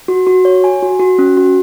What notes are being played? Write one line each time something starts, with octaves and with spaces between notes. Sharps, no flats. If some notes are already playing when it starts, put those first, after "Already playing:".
F#4
F#4
C#5
G#5
F#4
F#4
C#4
F#4